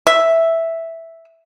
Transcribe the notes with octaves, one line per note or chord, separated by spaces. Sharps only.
E5